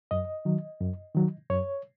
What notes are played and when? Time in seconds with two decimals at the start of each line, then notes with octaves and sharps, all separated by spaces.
0.11 F#2 D#5
0.45 D#3 F#3
0.80 F#2
1.15 D#3 F#3
1.50 F#2 C#5